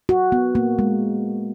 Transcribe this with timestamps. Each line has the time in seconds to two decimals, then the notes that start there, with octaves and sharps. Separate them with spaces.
0.09 F#4
0.32 B3
0.55 A#3
0.79 G#3